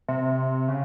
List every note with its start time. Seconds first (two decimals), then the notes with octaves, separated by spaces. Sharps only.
0.08 C3
0.68 C#3